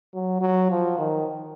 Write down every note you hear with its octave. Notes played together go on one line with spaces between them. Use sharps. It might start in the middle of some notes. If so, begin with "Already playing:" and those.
F#3
F#3
F3
D#3